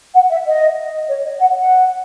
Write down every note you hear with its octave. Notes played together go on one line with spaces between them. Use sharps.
F#5
E5
D#5
C#5
D#5
F#5
F#5